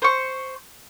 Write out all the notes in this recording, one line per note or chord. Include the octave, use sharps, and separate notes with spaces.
C5 C#6